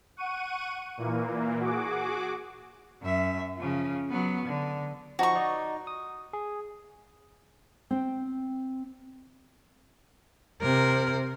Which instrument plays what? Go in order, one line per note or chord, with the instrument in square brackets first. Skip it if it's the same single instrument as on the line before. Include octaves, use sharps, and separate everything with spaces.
[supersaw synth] F#5 C#6 D#7
A#2 E3 A#3
F#4 G#4 D6
[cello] F#2 E5
C#3 F3
F#3 B3
D3
[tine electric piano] F3 D#4 [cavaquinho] F#4 C#6
[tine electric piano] D#4 D5 D#5
D#6
G#4
[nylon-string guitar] C4 G5
[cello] C3 A#4